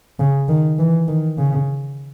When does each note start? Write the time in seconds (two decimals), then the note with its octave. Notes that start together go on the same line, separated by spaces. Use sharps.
0.19 C#3
0.48 D#3
0.79 E3
1.08 D#3
1.38 C#3